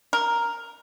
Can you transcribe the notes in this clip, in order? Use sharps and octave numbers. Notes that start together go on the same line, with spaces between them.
A#4